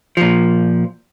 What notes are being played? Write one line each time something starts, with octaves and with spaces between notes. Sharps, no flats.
A#2 F3